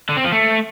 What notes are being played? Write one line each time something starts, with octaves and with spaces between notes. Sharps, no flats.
D3
C4
F3
A3